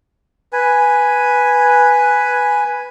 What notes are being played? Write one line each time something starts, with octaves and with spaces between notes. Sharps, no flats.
B4 G#5